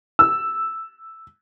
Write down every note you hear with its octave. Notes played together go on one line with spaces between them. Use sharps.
E6